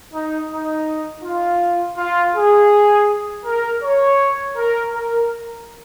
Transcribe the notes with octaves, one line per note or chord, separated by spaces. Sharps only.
D#4
D#4
F4
F4
G#4
A#4
C#5
A#4
A#4